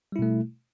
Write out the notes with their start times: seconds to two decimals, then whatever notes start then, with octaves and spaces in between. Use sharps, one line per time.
0.12 G3
0.16 E4
0.19 B2
0.22 A3